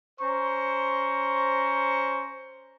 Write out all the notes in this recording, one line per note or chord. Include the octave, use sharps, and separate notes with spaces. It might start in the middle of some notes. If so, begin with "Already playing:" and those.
C#4 C5 A#5 C#6